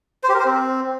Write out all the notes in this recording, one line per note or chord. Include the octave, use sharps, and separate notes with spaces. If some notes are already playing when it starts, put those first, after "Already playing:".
C5
G4
A#4
C5
C4